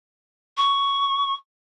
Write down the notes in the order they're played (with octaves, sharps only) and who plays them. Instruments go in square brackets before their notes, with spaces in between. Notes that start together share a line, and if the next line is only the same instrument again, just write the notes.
[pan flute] C#6